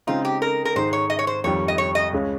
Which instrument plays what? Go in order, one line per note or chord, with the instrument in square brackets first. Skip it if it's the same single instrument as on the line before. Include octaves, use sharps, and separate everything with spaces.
[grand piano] C#3 G#3 C4 D#4 [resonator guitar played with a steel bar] F4
[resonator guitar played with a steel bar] G4
A#4
A#4
[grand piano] G#2 D#3 G#3 D#4 [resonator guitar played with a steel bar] C5
[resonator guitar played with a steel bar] C#5
D#5
C#5
C5
[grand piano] F2 D#3 G3 [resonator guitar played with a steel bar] C#5
[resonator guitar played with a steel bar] D#5
C#5
D#5
[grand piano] C#2 C#3 G#3 C#4